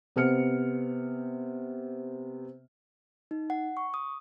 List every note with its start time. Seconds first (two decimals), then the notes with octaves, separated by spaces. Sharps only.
0.16 C3 B3 C4 F6 C#7
3.31 D#4
3.50 F#5
3.77 C#6
3.94 D#6